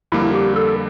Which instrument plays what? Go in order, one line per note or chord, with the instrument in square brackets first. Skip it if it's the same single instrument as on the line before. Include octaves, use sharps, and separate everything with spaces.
[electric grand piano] F2 D3 G3 A#3 [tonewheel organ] E4
[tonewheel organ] G4
A4